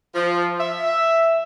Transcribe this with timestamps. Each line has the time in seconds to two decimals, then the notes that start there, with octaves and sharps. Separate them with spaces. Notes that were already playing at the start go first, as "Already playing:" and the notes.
0.15 F3
0.60 E5